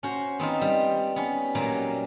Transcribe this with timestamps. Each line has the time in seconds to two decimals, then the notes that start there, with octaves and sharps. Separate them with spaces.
0.03 C#4 F#4 C5
0.39 B3 C4 D#4 F4
0.61 G3
1.16 B3 C#4
1.55 A#2 F#3 G3 A#3